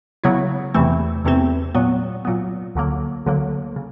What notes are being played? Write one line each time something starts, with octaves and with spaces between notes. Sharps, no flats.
C#3 F#3 B3 E4
E2 C3 E3 A3 C4
E2 C3 E3 A3 C4
A#2 F#3 B3
A#2 F#3 B3
D2 D3 F#3 A#3
D2 D3 F#3 A#3
C#3